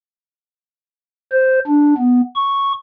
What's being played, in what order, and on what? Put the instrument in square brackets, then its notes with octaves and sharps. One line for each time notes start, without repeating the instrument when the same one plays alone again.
[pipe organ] C5
D4
B3
C#6